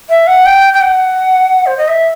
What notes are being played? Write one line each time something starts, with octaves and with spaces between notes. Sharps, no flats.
E5
F#5
G5
G5
F#5
C5
D#5
E5